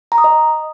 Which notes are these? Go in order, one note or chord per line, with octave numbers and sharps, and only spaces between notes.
A#5
D#6
D#5